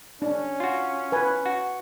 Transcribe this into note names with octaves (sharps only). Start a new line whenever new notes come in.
C#4 D4
F4 F#4
B4 G#5
F#4